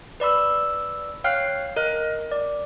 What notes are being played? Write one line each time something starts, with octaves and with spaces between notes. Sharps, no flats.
B4 D5 B5 E6
C#5 F5 G5 F6 F#6 C7
A#4 D#5 F#6
D5